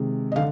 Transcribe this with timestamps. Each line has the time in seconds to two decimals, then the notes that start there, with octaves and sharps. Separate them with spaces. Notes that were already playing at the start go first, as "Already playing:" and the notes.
Already playing: C3 D#3 G#3
0.32 D#5
0.36 D3 F5